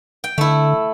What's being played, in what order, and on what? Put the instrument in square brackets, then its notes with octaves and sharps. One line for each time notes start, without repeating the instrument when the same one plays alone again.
[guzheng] G5
[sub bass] D3 [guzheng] A3 E4